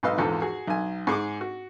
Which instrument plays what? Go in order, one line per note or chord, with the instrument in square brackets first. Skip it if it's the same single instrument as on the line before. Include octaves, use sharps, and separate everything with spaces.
[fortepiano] B1 G#2 B4 D#5 F5 E6
A#1 E2 G#2 F3 A4
F#4 G#4
B1 G#5
G#2 G#4 C#6 D6
F#4